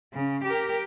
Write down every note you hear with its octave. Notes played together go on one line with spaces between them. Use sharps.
C#3
G4 A#4